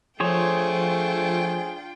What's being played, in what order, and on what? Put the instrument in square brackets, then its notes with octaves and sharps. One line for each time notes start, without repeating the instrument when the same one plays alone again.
[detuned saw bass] F3 [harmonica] A3 [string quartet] D4 F4 G5 [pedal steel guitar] G#4 C5 C#5